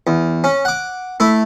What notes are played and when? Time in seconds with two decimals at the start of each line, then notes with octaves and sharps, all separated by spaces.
0.07 E2
0.44 C#4
0.65 F#5 D6
1.20 A3 E4